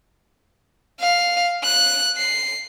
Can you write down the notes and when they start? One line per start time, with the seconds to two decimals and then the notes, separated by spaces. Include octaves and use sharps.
1.00 F5
1.64 F#6
2.17 C7